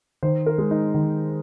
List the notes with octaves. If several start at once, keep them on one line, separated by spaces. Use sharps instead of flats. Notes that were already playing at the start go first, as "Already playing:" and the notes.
D#3 C5
A#4
G#3
D#4
D#3